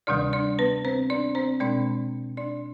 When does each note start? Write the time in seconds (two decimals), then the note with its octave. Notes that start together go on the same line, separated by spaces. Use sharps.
0.07 D2 C3 D#3 G3 D4 D5
0.33 D4 D5
0.59 B3 B4
0.85 C4 C5
1.10 D4 D5
1.35 C4 C5
1.60 B2 G#3 C4 D4 D5
2.37 D4 D5